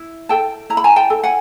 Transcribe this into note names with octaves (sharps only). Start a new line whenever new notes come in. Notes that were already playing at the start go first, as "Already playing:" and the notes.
Already playing: E4
A4 G5 A5
E4 A#5
B5
G#5 A#5
G5 A5
A4
F#5 G#5